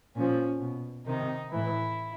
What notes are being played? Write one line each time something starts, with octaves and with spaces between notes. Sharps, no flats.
A#2 F3 C#4
B2
C3 D#3 D#4
A2 E3 E4